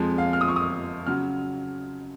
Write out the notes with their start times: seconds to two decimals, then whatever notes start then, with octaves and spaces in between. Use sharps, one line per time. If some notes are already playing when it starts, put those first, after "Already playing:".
Already playing: F2 F3 G#3
0.18 F5
0.33 F6
0.41 D#6
0.48 C#6
0.56 D#6
1.07 C#3 F#3 F6